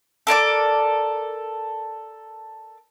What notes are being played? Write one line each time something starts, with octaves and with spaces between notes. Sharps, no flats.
A4 A#4 D5 D6